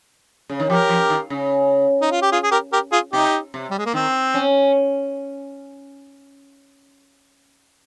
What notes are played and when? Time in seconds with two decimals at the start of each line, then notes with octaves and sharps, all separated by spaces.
0.49 C#3
0.60 D#3
0.70 F3 G4 A#4
0.89 F3
1.10 D#3
1.30 C#3
2.02 D#4
2.11 F4
2.22 G4
2.32 F4 G#4
2.43 G#4
2.51 G4 A#4
2.73 G4 A#4
2.92 F4 G#4
3.13 C3 D#4 G4
3.54 C3
3.70 G3
3.78 G#3
3.86 A#3
3.93 D#3 C4
4.34 C#4